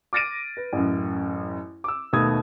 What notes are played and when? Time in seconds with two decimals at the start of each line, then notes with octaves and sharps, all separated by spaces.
0.13 D6 F6 A6 A#6 D7 D#7
0.57 B4
0.72 A1 F#2
1.84 D6 E6
2.13 D#2 B2 A3 D#6 G#6